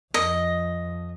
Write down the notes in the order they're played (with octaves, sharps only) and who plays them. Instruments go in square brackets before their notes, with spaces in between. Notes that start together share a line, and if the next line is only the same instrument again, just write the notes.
[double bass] F2 [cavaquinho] D#5